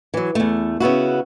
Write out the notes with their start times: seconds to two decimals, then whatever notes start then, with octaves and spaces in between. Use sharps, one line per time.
0.14 E3 F#3
0.35 E2 A3
0.80 C#3 B3 E4 F#4